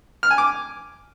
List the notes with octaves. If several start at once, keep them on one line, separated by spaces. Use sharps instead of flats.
F6
G#5
D6